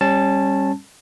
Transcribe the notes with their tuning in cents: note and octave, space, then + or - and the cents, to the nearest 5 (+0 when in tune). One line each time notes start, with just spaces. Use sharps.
G3 +15 C#4 -25 A5 +0